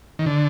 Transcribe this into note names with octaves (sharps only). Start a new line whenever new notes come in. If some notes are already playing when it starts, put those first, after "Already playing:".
D#3
D3